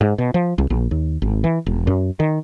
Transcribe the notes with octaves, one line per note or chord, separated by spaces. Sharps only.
G#2
B2
F3
C2
A#1
D#2
G#1
E3
E1
F#2
D#3